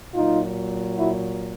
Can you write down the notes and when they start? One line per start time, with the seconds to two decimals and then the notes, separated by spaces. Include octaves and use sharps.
0.14 A#2 F#3 D#4 F4
0.96 E4 F#4